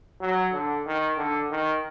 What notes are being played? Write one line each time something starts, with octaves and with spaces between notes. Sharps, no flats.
F#3
D3
D#3
D3
D#3